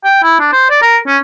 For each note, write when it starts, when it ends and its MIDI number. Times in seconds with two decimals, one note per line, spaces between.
0.04 0.22 79
0.23 0.39 64
0.40 0.48 62
0.52 0.69 72
0.70 0.78 74
0.82 0.98 70
1.07 1.17 61